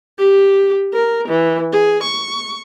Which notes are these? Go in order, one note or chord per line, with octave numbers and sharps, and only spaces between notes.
G4
A#4
E3
G#4
C#6